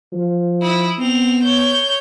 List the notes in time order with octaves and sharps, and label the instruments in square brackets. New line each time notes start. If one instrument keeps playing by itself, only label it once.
[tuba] F3
[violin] E4 D#6
[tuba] B3 [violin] C4 F7
[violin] C#5 G6